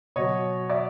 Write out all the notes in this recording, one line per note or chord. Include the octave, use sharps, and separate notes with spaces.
B2 F#3 C#5 D#5
D5 E5